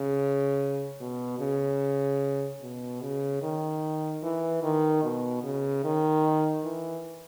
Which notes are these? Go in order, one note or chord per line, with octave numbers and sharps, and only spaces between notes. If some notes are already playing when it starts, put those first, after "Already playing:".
Already playing: C#3
B2
C#3
B2
C#3
D#3
E3
D#3
B2
C#3
D#3
E3